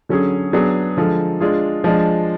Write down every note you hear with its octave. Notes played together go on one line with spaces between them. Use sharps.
D3 F#3 C#4 G#4
F#3 B3 D4 G#4
D3 F3 G#3
G#3 D4 F4 G#4
F3 G#3 D4